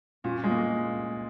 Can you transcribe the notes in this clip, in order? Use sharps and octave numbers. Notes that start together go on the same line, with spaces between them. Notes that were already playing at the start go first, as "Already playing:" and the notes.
A#2 C#4
G#3
A#3